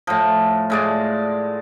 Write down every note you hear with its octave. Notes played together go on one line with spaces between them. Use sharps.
A2 F3
A2 G#3 D5